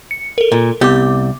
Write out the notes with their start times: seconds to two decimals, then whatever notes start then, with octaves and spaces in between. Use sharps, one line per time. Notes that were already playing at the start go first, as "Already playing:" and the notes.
0.11 C#7
0.38 A4 A#4
0.52 A#2
0.81 C2 B3 G4 D6